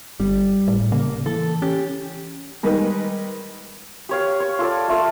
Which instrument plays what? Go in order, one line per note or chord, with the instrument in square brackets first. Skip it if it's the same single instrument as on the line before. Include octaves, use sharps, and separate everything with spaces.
[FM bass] G1 [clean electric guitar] G3
[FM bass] A2
[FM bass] C#3 [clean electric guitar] A#3
[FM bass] E3 [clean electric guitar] A4
[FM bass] C#4 [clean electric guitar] G4
[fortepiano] D#3 G3 G#3 D#4 A#4 B4
[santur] G4 C#5 F5
C#5
F4 A4 D5
A3 F4 A4